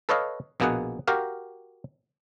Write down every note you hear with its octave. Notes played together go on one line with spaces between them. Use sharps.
A4 B4 C#5 D#5 F5
A#1 B2 A#3 B3 G#4 F#5
F#4 G4 A#4 F5